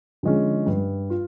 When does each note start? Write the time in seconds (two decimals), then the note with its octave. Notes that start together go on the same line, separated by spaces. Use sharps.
0.23 D3 F3 G#3 C#4
0.66 G2
1.10 F4